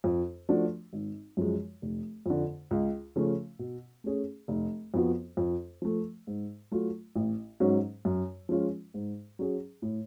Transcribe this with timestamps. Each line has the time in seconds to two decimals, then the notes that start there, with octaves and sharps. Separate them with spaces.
0.04 F2
0.49 F3 A3 D4 F#4
0.93 G#1
1.37 F#2 F3 G#3
1.82 F1
2.26 F2 D3
2.71 C#2
3.16 C#3 F3 A3 C#4
3.59 B2
4.04 A3 C#4 G#4
4.48 F1
4.94 F2 F3 B3 F#4
5.37 F2
5.82 F3 A3
6.27 G#2
6.71 F#3 A3 F4
7.15 A1
7.60 G#2 F#3 C#4
8.05 F#2
8.49 F3 G#3 C#4 F4
8.94 G#2
9.39 F#3 C#4 G#4
9.82 A2